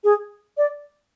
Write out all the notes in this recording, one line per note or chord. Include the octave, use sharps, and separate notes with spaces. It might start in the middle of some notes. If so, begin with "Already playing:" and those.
G#4
D5